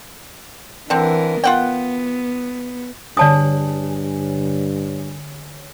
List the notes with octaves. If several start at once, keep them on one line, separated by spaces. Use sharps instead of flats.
D3 E3 C4 A#4
B3 F4 F#5 G5
G2 D3 C#5 D5 G#5 A5 D#6